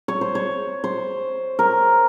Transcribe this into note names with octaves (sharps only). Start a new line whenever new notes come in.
C#5
C5
C#5
C5
A#4